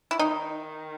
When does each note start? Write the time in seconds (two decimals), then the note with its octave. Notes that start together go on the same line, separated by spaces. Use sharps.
0.11 E4
0.19 D#3 D#4